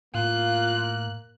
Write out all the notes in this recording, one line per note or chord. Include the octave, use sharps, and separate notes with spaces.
A2 A#3 F4 F#6